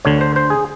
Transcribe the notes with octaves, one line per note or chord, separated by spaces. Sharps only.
D2 D3 C#5
C5
C5
G#4